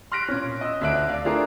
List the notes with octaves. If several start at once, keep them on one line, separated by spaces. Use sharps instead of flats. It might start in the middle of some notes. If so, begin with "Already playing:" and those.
C6 F6 F#6 A#6 B6 D7
A#2 C#4
D#5 E6
D2 D4 E5 F#6 D7
D5 F5
A3 D4 F4 G#4 A#4